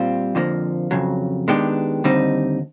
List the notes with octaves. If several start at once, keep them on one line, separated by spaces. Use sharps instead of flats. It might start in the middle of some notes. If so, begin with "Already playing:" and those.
Already playing: A#2 G3 C4 F4
F2 D3 F3 A#3
F2 C#3 F#3
D#3 G#3 B3 D4 G4
D#2 D3 G3 C4 D#4